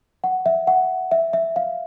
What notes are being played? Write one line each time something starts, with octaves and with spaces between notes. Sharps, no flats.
F#5
E5
F#5
E5
E5
F5